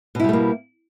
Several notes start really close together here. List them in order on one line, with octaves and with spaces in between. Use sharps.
B2 E4 G3 A3 A#3